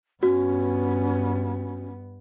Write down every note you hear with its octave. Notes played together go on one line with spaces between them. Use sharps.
G2 B3 C#4 F#4